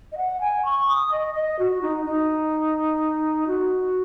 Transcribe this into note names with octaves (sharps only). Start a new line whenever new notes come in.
D#5
F#5
G#5
C#6
D#6
D#5
D#5
F#4
D#4
D#4
F#4